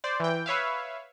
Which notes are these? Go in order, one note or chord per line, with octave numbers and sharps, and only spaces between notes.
C5 D5
E3 G5
B4 C#5 E5 F5